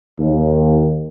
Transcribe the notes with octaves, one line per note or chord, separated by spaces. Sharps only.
D#2